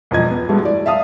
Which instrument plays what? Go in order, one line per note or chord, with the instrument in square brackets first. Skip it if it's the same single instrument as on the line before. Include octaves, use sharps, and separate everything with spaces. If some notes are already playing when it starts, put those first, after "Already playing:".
[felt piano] E1 F2 F3 D#5 G#6
B3
G2 B2 G#3 A3
E3 D5
E5 F5 A5 D#6